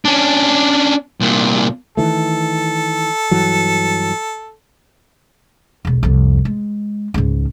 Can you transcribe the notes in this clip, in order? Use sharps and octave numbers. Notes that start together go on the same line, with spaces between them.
C#4 D4
C2 A#2
D#3 E3 A3 A4
G2 E3 F#3
E1 B1
C2 F2
G#3
C#2 G#2